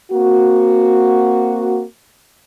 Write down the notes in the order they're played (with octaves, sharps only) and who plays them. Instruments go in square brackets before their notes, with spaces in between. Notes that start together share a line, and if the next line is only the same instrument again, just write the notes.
[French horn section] A#3 C4 F#4